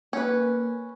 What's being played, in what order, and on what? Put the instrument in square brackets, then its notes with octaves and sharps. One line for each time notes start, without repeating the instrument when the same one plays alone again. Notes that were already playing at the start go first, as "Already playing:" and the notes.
[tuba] A#3 [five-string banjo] C#4 B4